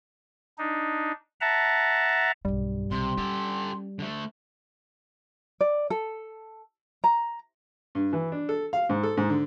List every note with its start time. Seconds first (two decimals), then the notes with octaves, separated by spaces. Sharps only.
0.58 D4 D#4
1.41 E5 F#5 A5 A#5
2.45 B1 G2 G3
2.91 B1 C3 C6
3.18 C#4 G4 A4
3.99 D3 A3
5.61 D5
5.90 A4
7.04 A#5
7.95 G2
8.13 E3
8.32 D4
8.49 A4
8.73 F5
8.89 G#2
9.03 A4
9.17 G#2
9.29 D3